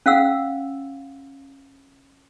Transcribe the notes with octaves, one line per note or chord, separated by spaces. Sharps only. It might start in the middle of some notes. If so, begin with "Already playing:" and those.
C#4 F5 F#5 E6